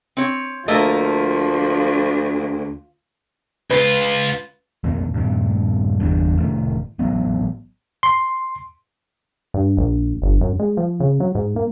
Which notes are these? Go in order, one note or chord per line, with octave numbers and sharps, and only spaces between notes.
C4 C#5
D2 F3 A3 A#3 D#5
C#2 F4 B4
B1 F2 B2 D#3
G2 A#2 D#3
G1 E2 G2
F1 A2 D#3
A1 F#3 B3
C6
G2
A#1
G1
F#2
G#3
F3
C#3
F#3
G#2
A#3